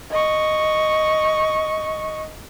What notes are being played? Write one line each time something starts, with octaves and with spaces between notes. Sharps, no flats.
D#5 C#6